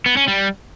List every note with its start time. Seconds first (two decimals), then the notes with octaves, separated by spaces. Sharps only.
0.06 B3
0.17 C#4
0.28 G3